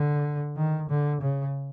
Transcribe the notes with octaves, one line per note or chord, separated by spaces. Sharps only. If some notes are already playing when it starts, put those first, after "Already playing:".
Already playing: D3
D#3
D3
C#3